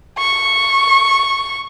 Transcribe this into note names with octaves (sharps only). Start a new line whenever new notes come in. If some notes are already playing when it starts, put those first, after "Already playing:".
C#6